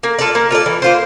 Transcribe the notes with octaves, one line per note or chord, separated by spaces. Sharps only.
A#3
F4 A4 D5
A#3
F4 A4 D5
E3
A#3 F4 C5